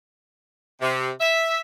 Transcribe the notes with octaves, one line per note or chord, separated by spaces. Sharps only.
C3
E5